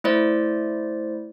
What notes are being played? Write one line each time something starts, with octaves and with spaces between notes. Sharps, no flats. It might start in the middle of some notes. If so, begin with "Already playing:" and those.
A3 E4 C5 D5